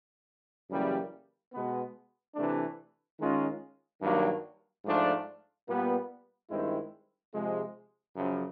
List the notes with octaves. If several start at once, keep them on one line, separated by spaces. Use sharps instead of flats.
F#2 C#3 E3 G3 A#3
B2 G#3 B3
C3 E3 A3 D4
D#3 G#3 C#4 F4
G2 D#3 F#3 A#3 D4
G#2 F3 A3 D4 F4
A#2 G3 B3
G2 D#3 G#3 C4 E4
C3 F3 G#3
F#2 C#3 F3